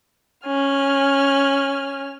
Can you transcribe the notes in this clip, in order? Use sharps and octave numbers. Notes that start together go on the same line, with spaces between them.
C#4 F6